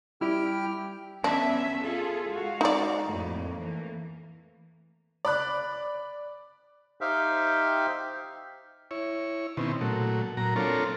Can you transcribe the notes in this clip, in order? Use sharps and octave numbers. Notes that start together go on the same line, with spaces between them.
G3 E4 G4 G5 F6
B3 C#4 D4 E5
F4 G#4 A4
G#3 F#4 F5
D#4 D5
F2 A2 A#3
E3 A3 A#3
D5 B5 F#6
D#4 G4 C5 E5 F5 G5
E4 C#5
B2 D#3 C4 C#4 E4
A#2 F#3 A3
A#2 F#3 A#5
C4 D4 F4 A4 A#4 C#5